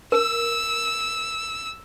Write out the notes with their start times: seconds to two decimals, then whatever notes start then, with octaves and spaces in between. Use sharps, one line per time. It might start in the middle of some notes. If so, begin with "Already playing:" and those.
0.12 A#4 E6